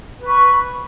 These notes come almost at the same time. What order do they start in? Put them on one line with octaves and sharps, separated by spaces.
B4 B5 C#6